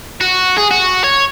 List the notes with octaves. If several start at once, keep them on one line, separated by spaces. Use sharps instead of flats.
F#4
G#4
F#4
C#5